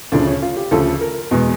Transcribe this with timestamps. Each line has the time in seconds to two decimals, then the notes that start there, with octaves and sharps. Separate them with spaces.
0.12 D2 C#3 F3 D4
0.27 C#4
0.42 F4
0.56 G4
0.71 D2 C#3 F3 A4
1.01 A#4
1.31 E2 B2 G#3